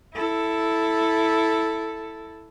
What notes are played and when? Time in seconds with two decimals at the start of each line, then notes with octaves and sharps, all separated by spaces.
0.14 E4 A4